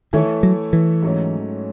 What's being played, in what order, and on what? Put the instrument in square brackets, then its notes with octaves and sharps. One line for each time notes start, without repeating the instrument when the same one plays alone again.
[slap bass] D#3 [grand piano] E3 A3 E4 A4 C#5
[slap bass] F#3
E3
[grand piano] G#2 F#3 A3 C#4